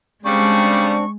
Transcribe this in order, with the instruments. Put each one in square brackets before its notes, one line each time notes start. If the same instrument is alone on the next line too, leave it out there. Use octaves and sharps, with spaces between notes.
[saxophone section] C#3 G3 [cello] G#3 [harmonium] C4 D4 [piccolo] C#6